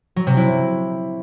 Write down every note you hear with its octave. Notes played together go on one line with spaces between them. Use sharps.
F#3
C3
E4